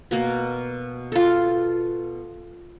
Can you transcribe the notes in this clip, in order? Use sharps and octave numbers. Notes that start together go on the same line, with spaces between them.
B2 A#3
F4 A4